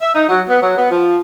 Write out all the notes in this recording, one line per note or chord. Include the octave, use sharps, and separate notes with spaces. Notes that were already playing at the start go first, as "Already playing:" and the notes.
E5
D#4
F#3
B3
F#3
B3
F3